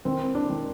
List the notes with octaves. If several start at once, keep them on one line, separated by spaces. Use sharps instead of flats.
D#3 C4
D4
D#3